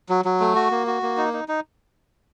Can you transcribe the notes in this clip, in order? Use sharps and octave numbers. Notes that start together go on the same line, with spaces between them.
F#3
F#3
A3
F#4
A#3
F#4
A#3
D#4
D#4
D#4